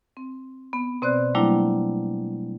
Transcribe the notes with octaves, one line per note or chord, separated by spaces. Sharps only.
C4
B3
B2 C4 C5 D5 F#6
F#3 G3 A3 A#3 D4 E4